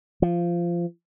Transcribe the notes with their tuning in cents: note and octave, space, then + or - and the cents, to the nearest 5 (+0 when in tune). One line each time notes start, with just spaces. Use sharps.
F3 -15